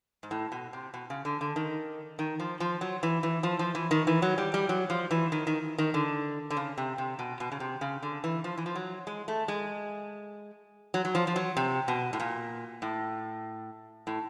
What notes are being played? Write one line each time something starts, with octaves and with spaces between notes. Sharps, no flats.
G#2
A2
B2
C3
B2
C#3
D3
D3
D#3
D#3
F3
F3
F#3
E3
E3
F3
F3
E3
D#3
E3
F#3
G3
G3
F#3
F3
E3
D#3
D#3
D#3
D3
D3
C#3
C3
C3
B2
B2
C#3
C3
C#3
D3
E3
F3
E3
F3
F#3
G#3
A3
G#3
F#3
F#3
F3
F3
F#3
C3
B2
A2
A#2
A2
A2